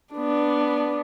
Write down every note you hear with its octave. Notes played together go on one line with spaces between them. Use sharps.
B3 D4